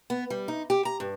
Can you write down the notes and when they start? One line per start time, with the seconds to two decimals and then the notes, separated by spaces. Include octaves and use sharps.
0.10 B3
0.30 G3
0.48 D#4
0.70 G4
0.85 A#5
1.00 G2